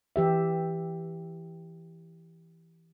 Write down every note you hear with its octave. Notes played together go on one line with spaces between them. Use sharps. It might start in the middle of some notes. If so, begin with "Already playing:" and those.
E3 G4 E5